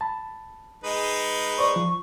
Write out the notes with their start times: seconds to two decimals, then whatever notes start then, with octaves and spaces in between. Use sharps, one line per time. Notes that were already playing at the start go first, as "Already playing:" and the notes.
0.01 A5 B5
0.84 G#3 D#4 B4
1.59 C5 D5 C#6
1.76 F3